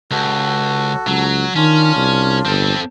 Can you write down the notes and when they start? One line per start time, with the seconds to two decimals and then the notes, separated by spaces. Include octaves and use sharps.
0.11 C#2 F#4 A4
1.07 C#2 F#3
1.56 D#3 C#4 D4 F4
1.96 C2
2.45 G1 C4 A4